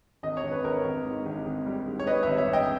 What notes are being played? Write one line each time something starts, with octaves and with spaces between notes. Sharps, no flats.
G#1 D#5
C#5
G#1
B4
G#1 A#4 C#5
G#1
G#2
G#1
G#1
G3
G#2
C#5
G3 B4 D#5
G#1 C#5 E5
C#5 E5
G#1
D#5 G5